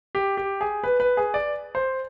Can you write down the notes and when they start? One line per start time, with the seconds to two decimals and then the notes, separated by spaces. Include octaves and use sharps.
0.15 G4
0.37 G4
0.61 G#4
0.84 B4
1.00 B4
1.17 G#4
1.34 D5
1.75 C5